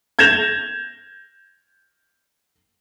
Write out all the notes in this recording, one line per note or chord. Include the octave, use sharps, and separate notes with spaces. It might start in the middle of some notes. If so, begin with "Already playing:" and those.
G6 G#6 A#6 E7 F7